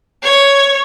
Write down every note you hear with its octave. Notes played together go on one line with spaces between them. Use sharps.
C#5